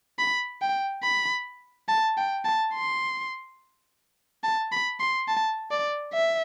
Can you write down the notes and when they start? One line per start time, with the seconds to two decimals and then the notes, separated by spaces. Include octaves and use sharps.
0.19 B5
0.62 G5
1.03 B5
1.88 A5
2.17 G5
2.45 A5
2.74 C6
4.44 A5
4.72 B5
5.00 C6
5.28 A5
5.71 D5
6.13 E5